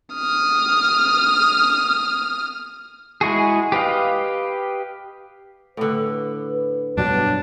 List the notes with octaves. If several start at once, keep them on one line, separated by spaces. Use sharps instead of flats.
D#6 F6
G#3 E4 F#4 G#4
G4 B4 D#5 F5
A2 D3 B4
G2 B2 F#3 D4